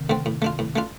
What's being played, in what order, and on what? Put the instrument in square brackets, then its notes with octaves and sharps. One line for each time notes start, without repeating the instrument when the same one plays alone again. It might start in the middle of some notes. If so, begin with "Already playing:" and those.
Already playing: [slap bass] C3 D#3
[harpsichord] D3 A3 C4
A2
A3 D4 F4
A2
A3 D4 F4